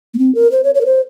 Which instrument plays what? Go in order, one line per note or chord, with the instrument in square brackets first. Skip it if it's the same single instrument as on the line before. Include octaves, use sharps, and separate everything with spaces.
[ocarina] A#3
C4
A#4
C5
C#5
C#5
A#4
C5